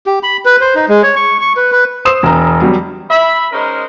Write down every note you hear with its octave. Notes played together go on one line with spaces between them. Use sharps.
G4
B5
B4
C5
D#4
G#3
C#5
C#6
C#6
B4
B4
C5 C6 D#6 E6 E7
E1 A#5
F#3 G3
E5 B5
G#3 C#4 D#4 A#4 C5